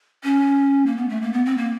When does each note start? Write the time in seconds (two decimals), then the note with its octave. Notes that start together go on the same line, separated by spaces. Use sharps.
0.24 C#4
0.86 A#3
0.97 B3
1.09 A3
1.22 A#3
1.33 B3
1.45 C4
1.57 A#3